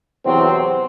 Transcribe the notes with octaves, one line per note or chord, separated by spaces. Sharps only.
E2 C3 F#3 C4